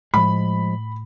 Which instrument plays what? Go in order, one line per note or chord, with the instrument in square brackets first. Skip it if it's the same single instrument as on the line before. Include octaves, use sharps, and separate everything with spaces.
[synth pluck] A2 [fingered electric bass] F3 G#3 [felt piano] B5